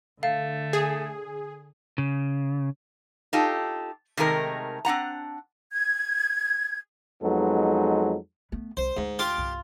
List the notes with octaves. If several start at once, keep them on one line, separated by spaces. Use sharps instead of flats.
D3 A3 F5
G#4
C#3
D#4 F4 G4 A4
C3 D#3 G#3 A3 A#4 D#5
C4 D4 F#5 A#5
G#6
F2 F#3 G#3 B3 D#4 A4
A3 B3
C2 C5
D2 G#2
F4 G4 C6 D6
C2 G2